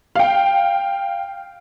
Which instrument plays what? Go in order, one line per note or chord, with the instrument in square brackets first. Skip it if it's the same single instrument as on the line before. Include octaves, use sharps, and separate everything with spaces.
[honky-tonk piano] F5 G5